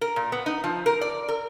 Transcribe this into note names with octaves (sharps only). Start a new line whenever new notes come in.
A#4
A#2
B3
D#4
F3
A#4
D5
A#4